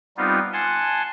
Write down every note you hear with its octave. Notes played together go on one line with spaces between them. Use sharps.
G3 B3 C4 D#4 F4
F#5 G#5 A5 C6